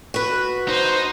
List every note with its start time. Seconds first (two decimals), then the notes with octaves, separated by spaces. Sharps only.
0.14 F#4 B4
0.68 D#4 C5